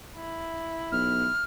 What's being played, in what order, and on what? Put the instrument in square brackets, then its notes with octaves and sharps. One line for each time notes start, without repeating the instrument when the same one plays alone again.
[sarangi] E4
[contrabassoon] B1 [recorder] F6